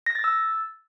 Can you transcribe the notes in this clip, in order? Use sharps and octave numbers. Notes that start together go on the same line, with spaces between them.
A#6
A6
E6